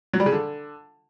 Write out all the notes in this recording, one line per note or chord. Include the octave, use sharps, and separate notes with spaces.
F#3
G3
C#3
D3